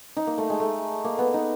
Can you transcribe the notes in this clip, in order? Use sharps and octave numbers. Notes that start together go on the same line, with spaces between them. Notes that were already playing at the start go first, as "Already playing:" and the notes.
D#4
A#3
A3
G#3
A3
A#3
B3
D#4